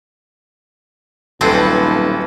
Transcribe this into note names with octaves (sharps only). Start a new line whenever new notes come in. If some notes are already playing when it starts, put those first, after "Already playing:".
D#1 B1 C4 A4 B4